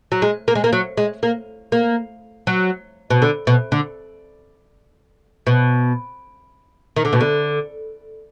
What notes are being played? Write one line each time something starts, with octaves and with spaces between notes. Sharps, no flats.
F#3
G#3
A#3
G#3
A#3
F#3
G#3
A#3
A#3
F#3
B2
D3
B2
D3
B2
D#3
D3
B2
D3